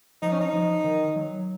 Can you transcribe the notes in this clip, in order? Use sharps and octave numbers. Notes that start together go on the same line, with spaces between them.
F3 D#4
C#4
D#4
F3
D#3
F#3